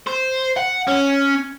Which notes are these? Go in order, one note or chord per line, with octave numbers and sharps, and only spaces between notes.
C5
F#5
C#4